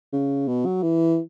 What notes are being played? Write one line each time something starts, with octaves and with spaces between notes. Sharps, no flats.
C#3
B2
F#3
E3